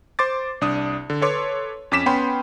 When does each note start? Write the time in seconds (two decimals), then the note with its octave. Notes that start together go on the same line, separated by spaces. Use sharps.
0.19 C5 C6 D6 A6
0.61 C2 D4 D#6
1.10 D3
1.22 A4 B4 C#5 C6 D6
1.92 F2 C#4 D6 B6 E7
2.06 B3 C#4 G5 B5 C6